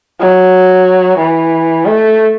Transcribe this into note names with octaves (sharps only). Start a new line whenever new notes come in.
F#3
E3
A3